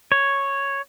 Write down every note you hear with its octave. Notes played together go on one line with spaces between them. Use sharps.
C#5